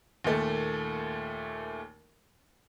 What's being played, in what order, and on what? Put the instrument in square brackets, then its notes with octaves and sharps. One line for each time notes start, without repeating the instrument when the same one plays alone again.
[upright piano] D#2 A#2 A3